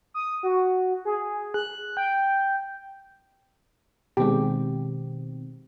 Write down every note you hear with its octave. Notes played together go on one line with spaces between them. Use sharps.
D#6
F#4
G#4
F#6
G5
B2 D#3 G#3 C4 G4